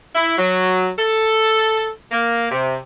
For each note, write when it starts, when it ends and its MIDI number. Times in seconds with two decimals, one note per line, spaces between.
0.15 0.37 64
0.38 0.88 54
0.98 1.88 69
2.11 2.48 58
2.51 2.76 48